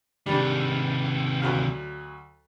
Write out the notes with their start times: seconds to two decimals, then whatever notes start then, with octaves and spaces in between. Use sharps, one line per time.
0.26 C3 D#3 G3 D4
1.42 D2 F#3 F5